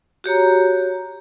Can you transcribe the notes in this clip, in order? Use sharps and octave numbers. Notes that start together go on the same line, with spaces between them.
F#4 G4 C#5 A#5